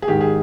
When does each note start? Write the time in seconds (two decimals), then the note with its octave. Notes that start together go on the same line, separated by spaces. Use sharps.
0.02 G#4
0.08 G#2 D#3 G4
0.21 G#4